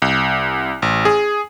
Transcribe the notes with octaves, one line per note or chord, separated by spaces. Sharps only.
C2
A1
G#4